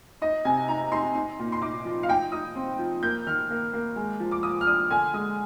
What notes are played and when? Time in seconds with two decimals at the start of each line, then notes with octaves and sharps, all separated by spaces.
0.22 D#4 D#5
0.45 C3 G#5
0.68 D#4 A#5
0.92 D#4 C6
1.15 D#4
1.39 A#2
1.52 C6
1.62 D#4 D6
1.85 F3
2.03 F5
2.09 D#4 G5
2.32 D#4 D#6
2.55 C4
2.79 F3
3.03 A#3 G6
3.27 D#3 F6
3.50 A#3
3.73 A#3
3.96 G#3
4.20 F3
4.31 D6
4.43 F3 D#6
4.61 F6
4.67 D4 D#6
4.91 D3 G#5
5.14 G#3 D#6